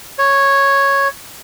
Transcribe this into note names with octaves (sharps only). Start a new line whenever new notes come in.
C#5